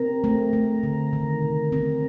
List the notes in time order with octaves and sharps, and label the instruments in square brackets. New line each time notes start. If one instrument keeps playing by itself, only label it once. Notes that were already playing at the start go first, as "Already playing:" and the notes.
Already playing: [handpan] C4 [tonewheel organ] A#4
[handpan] A3
A3
D3
D#3
C3
C4